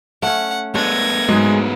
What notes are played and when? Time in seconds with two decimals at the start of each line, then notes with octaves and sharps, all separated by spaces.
0.22 A3 C#4 F#5
0.75 G#3 A3 B3 D4 C#5 G#6 A#6
1.29 G#2 F#3 G#3 G#4